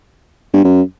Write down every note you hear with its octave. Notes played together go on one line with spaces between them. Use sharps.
G2
F#2